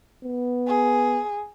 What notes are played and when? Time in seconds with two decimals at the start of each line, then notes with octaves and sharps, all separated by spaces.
0.24 B3
0.67 G#4